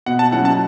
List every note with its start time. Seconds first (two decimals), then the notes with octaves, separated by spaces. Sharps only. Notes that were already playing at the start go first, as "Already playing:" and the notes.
0.06 B2 F#5
0.19 A5
0.31 F#3 C#4 E4 F#5
0.45 A5